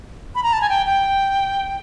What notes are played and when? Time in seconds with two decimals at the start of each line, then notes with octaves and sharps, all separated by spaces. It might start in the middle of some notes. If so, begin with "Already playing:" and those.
0.35 B5
0.43 A#5
0.53 A5
0.61 G#5
0.69 G5
0.86 G5